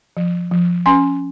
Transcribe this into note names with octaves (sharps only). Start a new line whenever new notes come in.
F3
F3
C#4 G#5 C6